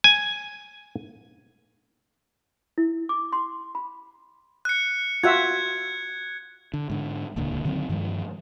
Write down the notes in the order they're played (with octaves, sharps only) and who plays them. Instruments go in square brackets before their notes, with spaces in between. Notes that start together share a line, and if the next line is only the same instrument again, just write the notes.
[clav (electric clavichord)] G#5
[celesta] E4
D6
C6
B5
[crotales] F#6 C#7
[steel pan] F4 F#4 E5 [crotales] F#6 G#6
[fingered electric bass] D3
G#2 D3
D#1 C#2 A#2 D3
D3 D#3 F#3 C4
G2 D#3 F3 G#3